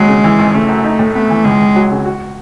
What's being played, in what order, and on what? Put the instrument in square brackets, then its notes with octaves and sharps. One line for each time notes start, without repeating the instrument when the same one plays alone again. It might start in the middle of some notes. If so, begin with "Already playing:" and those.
Already playing: [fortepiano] D#2 F#3 [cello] G#3
[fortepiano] C#3
E3
G#1
[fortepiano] C#3 [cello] A3
[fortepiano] F#2
D#4
A2
[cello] A3 [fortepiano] B3
[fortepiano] E3
[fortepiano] C#2 [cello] G#3
[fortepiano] C#2
F#3
C#3
F#4